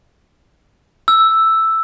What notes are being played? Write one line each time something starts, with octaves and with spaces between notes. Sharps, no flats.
E6